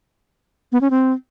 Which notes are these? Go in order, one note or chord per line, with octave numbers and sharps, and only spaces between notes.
B3
C#4
C4